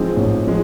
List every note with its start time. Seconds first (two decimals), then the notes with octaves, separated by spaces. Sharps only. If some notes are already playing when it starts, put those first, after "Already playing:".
Already playing: G#2 F3 G#3 C4
0.16 A1
0.47 F3 G#3